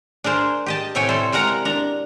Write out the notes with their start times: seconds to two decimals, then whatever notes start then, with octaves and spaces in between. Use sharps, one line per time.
0.24 D4 G#4 A#4 C5
0.66 G4 D#5 A5
0.95 A2 C3 E4 C#5 G5 G#5
1.09 G3 A4 C5
1.32 G3 G#3 A#4 F#5 A#5
1.65 D4 A#5